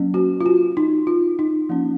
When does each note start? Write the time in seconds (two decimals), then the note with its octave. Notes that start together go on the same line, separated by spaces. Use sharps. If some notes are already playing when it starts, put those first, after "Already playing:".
Already playing: F#3 A#3 C#4
0.14 F#4
0.41 F4
0.46 F#4
0.77 D#4
1.07 F4
1.39 D#4
1.69 F3 A#3 C#4